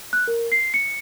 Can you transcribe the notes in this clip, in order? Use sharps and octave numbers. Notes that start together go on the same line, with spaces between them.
F#6
A#4
C7
C#7